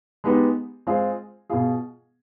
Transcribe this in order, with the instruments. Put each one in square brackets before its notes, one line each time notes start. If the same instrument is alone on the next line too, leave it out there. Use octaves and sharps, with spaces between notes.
[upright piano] G#3 B3 D#4 G4
G#3 C4 F4 G#4
B2 B3 F4 G#4